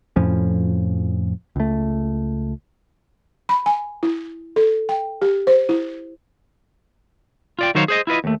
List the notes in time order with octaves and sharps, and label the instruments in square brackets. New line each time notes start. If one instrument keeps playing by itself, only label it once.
[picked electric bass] F2 A2 F3 C#4
C#2 A3
[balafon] B5
G#5
E4
A4
G5
G4
C5
E4
[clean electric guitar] F4 D5 G5
D#3 F#3 D#4 C5 C#5 F5
G#4 C5 D#5
E4 F4 B4 D#5
D#2 A3